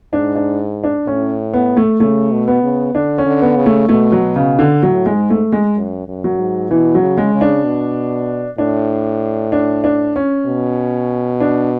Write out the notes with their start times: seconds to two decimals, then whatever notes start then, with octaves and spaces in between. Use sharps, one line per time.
0.13 G#2 D4
0.36 D4
0.84 D4
1.07 A2 C#4
1.53 B3
1.77 A3
2.00 C#3 A3
2.32 B2
2.48 B3
2.63 C#3
2.95 D3 D4
3.18 C#4
3.26 D3
3.42 B3
3.57 C#3
3.66 A3
3.89 B2 A3
4.12 F#3
4.36 C#3
4.59 D3
4.82 A2 F#3
5.06 G#3
5.14 G#2
5.30 A3
5.53 G#3
5.76 F#2
6.08 F#2
6.24 F#3
6.39 G#2
6.70 B2 E3
6.95 F#3
7.02 C#3
7.18 G#3
7.34 C#3
7.41 D4
7.65 B2
8.58 A2 D4
9.52 D4
9.84 D4
10.16 C#4
10.46 B2
11.40 D4